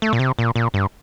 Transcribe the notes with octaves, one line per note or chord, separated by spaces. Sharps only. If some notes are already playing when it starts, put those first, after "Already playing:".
A3
A#2
C3
A#2
A#2
G2